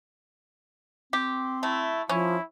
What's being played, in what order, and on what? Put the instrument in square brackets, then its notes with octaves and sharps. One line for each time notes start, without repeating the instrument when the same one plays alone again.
[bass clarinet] C4 [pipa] G4
[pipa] A3 [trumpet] E4
[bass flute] F3 [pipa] C#4 [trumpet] E4